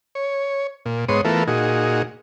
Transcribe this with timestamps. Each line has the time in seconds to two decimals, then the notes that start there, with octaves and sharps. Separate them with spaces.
0.15 C#5
0.86 A#2
1.09 G#2 B3 C#5 C6 D#6
1.25 E3 A3 B3 F4 A4 A#4
1.47 A#2 D#4 F#4 G#4